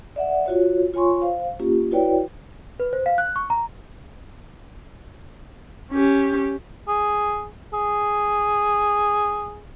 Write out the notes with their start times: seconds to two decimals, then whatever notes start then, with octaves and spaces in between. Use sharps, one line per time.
0.16 D5 E5 F#5
0.46 F4 F#4 C#5
0.94 F4 C#5 G#5 C6 C#6
1.22 C5 F5
1.60 A#3 C#4 F4 G4
1.91 E4 F#4 B4 C#5 D5 G5
2.80 B4
2.93 C5
3.06 F5
3.18 F#6
3.36 C#6
3.50 A#5
5.92 C#4 G4
6.88 G#4
7.74 G#4